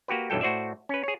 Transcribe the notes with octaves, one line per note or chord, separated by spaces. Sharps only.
A#3 F#4 G4 B4
B1 G2 E3 F#3 A4 G5
A2 F#4 C5 D5 E5
C#4 B4
G#4 C#5